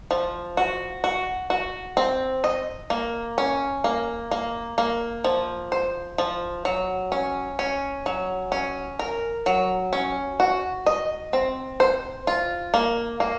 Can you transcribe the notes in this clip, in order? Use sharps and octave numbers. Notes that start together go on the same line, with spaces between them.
F3
F#4
F#4
F#4
C4
D#5
A#3
C#4
A#3
A#3
A#3
F3
C5
F3
F#3
C#4
C#4
F#3
C#4
A#4
F#3
C#4
F#4
D#5
C4
C5
F4
A#3
A#3